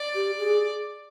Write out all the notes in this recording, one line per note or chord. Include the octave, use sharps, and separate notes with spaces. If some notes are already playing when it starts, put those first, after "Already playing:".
Already playing: D5
G4
G#4